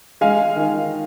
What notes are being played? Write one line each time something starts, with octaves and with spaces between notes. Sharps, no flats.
G#3 F5 G#5
D#3